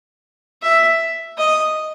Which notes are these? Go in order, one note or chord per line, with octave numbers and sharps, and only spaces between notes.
E5
D#5